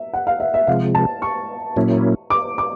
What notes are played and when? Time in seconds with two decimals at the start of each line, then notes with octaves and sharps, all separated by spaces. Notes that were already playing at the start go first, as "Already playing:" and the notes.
Already playing: E5
0.14 F#5
0.27 F5
0.40 E5
0.54 E5
0.67 C3 F3 G#3 F5
0.95 A5
1.22 C#6
1.76 A#2 F#3 A#3 C#4 E4
2.30 D6
2.58 D6